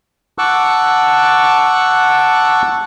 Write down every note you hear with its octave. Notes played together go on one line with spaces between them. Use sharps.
F#5 A5 C#6 D6 E6 F#6